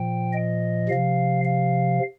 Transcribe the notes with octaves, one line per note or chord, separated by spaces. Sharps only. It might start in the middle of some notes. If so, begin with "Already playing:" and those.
Already playing: A#2 F3 G5
D#5
C3 F3 F5
F5